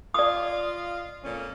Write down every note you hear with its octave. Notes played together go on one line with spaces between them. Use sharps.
F4 D5 D#5 F5 D#6
F2 A#2 C#4